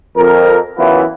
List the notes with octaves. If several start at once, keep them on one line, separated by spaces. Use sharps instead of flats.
F2 A#4
F#2 E3 B3 E4 F4 B4